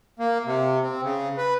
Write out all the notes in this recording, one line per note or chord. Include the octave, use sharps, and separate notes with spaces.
A#3
C3
C4
C#3
B4